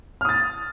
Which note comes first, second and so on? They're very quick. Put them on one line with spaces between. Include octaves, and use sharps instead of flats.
F6 D#6 A6